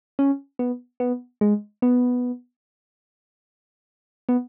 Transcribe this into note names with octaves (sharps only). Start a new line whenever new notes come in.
C#4
B3
B3
G#3
B3
B3